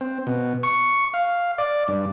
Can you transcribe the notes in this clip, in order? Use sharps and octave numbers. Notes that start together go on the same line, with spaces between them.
C4
B2
C#6
F5
D5
G2